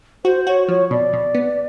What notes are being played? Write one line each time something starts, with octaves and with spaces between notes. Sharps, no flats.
F#4 C5
F#4 C#5
F3 C#5
B2 D5
B2
B3